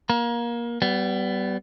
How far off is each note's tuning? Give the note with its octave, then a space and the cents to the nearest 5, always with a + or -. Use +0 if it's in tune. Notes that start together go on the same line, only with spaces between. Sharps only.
A#3 +20 A#5 +30
G3 -20 B3 +15